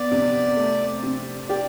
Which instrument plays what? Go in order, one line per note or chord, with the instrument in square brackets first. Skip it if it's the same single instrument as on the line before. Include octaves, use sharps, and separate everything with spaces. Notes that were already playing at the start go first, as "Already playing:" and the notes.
Already playing: [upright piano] B3 [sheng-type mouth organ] D5
[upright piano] C3
A3
C3
[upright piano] G4 [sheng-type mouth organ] D5